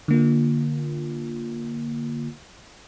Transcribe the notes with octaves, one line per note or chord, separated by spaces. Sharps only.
D3 A#3 F4